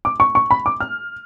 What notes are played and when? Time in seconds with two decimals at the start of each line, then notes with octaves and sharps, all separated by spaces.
0.05 D6
0.20 C#6
0.35 C#6
0.51 B5
0.66 D6
0.80 F6